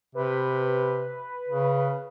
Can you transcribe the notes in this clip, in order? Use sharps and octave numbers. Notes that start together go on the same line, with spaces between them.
C3 B4
C#3